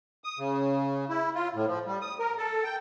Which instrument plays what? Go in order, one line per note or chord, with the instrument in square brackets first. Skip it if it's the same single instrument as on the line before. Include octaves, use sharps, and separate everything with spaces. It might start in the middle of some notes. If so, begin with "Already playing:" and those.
[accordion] D#6
C#3
E4
F4
A2
F3
G3
D#6
A#4
A4
G5